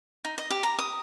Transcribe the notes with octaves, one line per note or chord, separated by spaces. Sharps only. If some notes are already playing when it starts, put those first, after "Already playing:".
D#4
D#5
G4
A#5
D#6